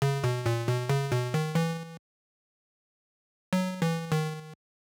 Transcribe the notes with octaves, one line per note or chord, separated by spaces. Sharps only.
C#3
B2
A#2
B2
C#3
B2
D#3
E3
F#3
E3
D#3